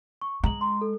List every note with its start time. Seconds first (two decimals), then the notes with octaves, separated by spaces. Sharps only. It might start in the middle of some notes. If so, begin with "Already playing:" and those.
0.22 C#6
0.44 G#3 A#5 F#7
0.61 A#5 C6
0.81 A4